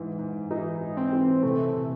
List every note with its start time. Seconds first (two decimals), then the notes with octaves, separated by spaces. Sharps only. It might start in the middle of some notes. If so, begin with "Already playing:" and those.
Already playing: G#2 E3
0.19 G#2
0.50 E3 D#4
0.81 G#2
0.97 C4
1.13 E3
1.43 C3 A3
1.74 C3